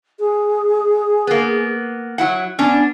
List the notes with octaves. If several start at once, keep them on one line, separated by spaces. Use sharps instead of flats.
G#4
A#3 B3
F#3 E4 F#5
B3 C#4 D4